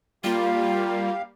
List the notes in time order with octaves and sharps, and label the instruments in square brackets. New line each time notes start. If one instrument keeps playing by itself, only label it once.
[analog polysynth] G3 A#3 [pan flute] F4 [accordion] G4 F5